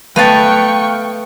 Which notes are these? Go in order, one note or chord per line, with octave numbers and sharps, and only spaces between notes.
A3 B3 B4 F5 G5 A5 C#6